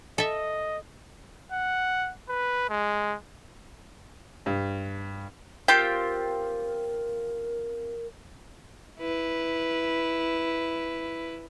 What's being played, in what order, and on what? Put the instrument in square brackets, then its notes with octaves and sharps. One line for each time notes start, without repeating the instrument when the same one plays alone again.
[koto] A4 E5 [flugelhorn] D#5
[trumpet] F#5
B4
G#3
[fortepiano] G2
[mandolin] C4 F4 G4 [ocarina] A#4 [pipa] G5
[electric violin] E4 B4